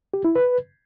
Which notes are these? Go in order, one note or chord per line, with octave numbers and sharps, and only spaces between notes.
G4
E4
B4